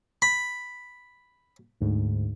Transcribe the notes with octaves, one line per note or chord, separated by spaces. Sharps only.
B5
D2 G#2